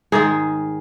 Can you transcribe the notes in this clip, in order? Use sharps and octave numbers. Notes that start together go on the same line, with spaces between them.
G#2 D#3 G#3 G#4